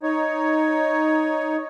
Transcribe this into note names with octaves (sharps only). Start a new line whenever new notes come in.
D#4 C#5